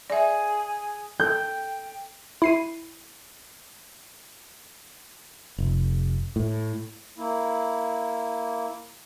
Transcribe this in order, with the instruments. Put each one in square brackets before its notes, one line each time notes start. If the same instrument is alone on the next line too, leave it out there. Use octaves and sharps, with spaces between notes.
[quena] G#4 [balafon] D5 E5
[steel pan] A4 [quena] G5 [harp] G6
[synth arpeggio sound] E4 C7 D#7
[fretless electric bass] F1
A2
[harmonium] A#3 E4